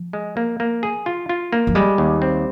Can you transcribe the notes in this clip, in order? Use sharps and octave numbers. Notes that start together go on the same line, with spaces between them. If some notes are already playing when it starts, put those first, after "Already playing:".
Already playing: F3
G#3
A#3
A#3
G#4
F4
F4
A#3
F3
G3 G#3
D#2
C4